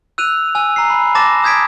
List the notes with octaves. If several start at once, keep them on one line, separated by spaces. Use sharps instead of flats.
E6 F#6 D#7 F7
G#5 E6
A#5 C7
B5
A5 C6 D6 A6 A#6 E7
D#6 G6 G#6 B6 D7